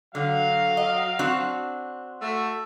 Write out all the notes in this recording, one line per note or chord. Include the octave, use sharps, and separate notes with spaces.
D3 F#3 F5
D#5
C4 D4 F#4
A3 F#4 E5